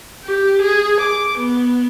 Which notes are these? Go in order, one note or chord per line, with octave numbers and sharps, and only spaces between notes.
G4
G#4
D6
B3